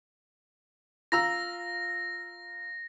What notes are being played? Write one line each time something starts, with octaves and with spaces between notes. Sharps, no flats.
F4 A#5 E6 A#6